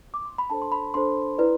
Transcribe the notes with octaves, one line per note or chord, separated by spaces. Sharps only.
D6
C6
B5
D4 A4 C5 A5
C6
B5
D4 A4 C5 C6
E4 B4 D5